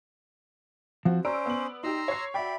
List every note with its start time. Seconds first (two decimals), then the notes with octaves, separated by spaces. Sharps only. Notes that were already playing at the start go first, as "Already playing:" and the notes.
1.05 F3 C4 F#4
1.25 C#4 C5 D5 A#5 E6 D7
1.46 B3 F#7
1.83 D#4 G4 A#5 C6 E6
2.08 C#5 C7
2.34 F#4 D5 E5 G5 B5